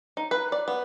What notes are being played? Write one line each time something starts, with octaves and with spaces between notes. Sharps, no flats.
D#4
B4
D5
B3